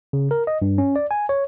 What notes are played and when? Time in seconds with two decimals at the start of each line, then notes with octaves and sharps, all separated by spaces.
0.13 C#3
0.31 A#4
0.47 D#5
0.62 G2
0.78 C#4
0.96 D5
1.11 G#5
1.29 C#5